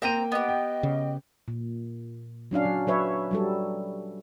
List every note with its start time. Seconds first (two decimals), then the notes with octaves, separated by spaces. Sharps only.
0.02 A#3 C4 G5 A#5 D#7
0.32 B3 G4 D#5
0.49 G5
0.83 C#3
1.48 A#2
2.51 F#3 C#4 D4 F5
2.65 F#3
2.87 F#3 B4 C#5 E5
3.31 F#3 G3 A4